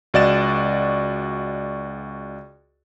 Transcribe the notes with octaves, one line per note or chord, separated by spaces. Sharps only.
C#2 F#4 D5 D#5 A6 E7